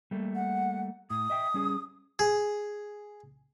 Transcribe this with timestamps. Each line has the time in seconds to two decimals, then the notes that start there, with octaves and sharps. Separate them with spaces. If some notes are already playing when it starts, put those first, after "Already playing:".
0.11 G3 A3 A#3
0.35 F#5
1.10 A2 D#6
1.30 D#5 E5 G5
1.54 G3 C#4 G#4
2.19 G#4